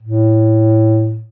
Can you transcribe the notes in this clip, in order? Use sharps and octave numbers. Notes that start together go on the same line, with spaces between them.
A2